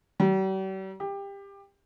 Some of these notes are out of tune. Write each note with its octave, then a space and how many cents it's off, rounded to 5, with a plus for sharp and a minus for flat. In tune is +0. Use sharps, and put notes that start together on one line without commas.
G3 -45
G4 +20